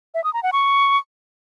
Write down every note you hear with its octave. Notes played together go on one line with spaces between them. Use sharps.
E5
D#6
A#5
F#5
C#6